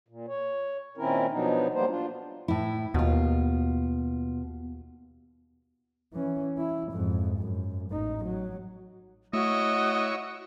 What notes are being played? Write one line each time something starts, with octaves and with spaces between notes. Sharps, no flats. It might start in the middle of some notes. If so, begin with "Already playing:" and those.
A#2
C#5
A#2 D#3 C4 C#4 E4 A#4
B2 F3 F#3 B3 D4 D#4
F#3 G3 A#3 B3 C5
D4 F4
A2 E4
D#2 B2 F4
E3 C#4
E4
F2 G#2
F#2
A1 D#4
F#3
A3 E4 F#4 C#5 D#5